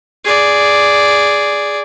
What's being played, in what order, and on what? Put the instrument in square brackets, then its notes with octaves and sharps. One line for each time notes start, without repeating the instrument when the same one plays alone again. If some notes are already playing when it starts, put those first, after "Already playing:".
[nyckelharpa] G#4 D5